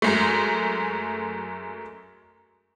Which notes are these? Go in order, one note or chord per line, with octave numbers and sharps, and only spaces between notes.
F#2 G#3 A3